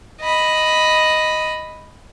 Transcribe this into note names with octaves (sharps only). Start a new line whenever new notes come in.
D#5 B5